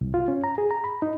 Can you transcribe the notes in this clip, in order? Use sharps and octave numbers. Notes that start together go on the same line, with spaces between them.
C2
F4
C#4
A#5
G#4
A#5
B5
D#4